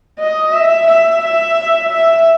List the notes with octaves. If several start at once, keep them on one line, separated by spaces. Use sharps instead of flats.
D#5
E5
E5
E5
E5